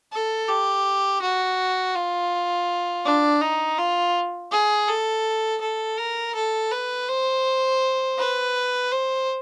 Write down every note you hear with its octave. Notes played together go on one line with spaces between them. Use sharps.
A4
G4
F#4
F4
D4
D#4
F4
G#4
A4
A4
A#4
A4
B4
C5
B4
C5